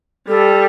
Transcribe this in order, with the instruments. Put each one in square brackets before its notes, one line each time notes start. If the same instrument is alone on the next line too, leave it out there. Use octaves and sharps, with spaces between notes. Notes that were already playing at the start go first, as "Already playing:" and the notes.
[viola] G3 [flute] A4